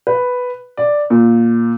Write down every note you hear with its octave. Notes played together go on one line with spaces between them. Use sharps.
B4
D5
A#2